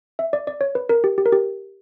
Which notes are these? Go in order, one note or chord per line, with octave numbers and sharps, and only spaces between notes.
E5
D5
D5
C#5
B4
A#4
G4
G4
A#4
G4